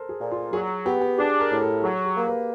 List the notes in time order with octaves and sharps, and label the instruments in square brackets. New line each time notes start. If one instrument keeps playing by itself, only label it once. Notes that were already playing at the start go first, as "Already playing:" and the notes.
Already playing: [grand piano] A4 A#4 C5
G#4
[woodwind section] A#2
[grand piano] F4
[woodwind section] F#3 [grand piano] G#4
[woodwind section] B3 [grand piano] G4
[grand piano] G4
[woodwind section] D4 [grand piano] G#4
[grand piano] A#4
[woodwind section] A2
[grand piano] A4
[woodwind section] F#3 [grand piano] G#4
[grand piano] G4
[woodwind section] A#3
[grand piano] B4